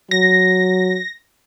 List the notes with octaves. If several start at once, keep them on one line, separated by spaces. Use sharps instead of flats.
F#3 A#6